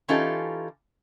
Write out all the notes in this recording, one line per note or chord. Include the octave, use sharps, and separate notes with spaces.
E3 C#4 D#4 F4 G4 A4